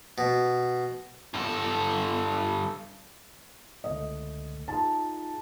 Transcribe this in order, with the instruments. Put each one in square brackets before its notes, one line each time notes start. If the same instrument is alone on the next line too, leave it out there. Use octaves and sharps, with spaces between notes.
[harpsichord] B2
[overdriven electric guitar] G2 A4
[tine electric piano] C#2 D3 A3 [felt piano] D#5
[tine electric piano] D#4 F4 G#4 [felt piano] A5